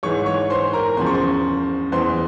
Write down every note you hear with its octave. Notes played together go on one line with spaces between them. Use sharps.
G#2 E3 C#5 C#6
C#5 C#6
C5 C6
A#4 A#5
E2 C#3 F3 C6
C#6
C5 C6
E2 E3 C5 C6